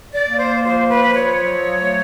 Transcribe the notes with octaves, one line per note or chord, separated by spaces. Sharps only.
D5
A#3
C5
F3 C5
B4
F3
C#5
F#3
A3